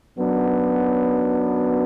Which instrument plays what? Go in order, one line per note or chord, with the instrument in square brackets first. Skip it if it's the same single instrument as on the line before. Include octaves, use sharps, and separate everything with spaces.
[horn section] F#2 F#3 B3 D4